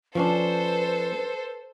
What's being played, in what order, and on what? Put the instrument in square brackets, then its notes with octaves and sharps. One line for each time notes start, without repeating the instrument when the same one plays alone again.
[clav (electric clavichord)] F3 C#4 D4 [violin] A4 C5 [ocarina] B4